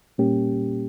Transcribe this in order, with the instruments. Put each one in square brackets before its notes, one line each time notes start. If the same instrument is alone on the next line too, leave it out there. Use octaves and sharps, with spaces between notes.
[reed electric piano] A#2 G3 A#3 C#4 G4